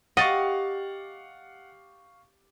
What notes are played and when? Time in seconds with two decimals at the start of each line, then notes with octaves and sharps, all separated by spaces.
0.17 G4 D#5 F5 F#5 C#6 A6